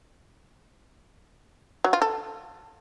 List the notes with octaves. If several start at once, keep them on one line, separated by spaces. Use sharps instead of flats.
F#3
F4
A4